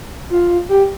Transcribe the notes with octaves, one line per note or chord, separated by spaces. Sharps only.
F4
G4